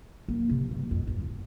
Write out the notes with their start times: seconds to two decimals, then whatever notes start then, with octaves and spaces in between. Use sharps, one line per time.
0.28 A#3
0.50 C3
0.71 G2
0.91 F2
1.07 G2